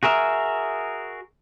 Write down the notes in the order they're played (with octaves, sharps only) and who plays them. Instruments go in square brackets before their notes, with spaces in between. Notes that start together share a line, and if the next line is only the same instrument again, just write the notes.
[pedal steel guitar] F#4 G#4 A#4 E5